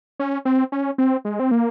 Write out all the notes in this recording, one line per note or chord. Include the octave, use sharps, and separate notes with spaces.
C#4
C4
C#4
C4
G#3
C4
A#3